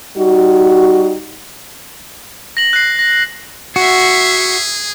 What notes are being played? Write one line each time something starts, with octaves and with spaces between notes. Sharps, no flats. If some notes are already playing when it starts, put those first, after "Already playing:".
G3 D#4 F#4
A#6 F#7
F#6 C7
A#6
F#4 G#4 E5 C7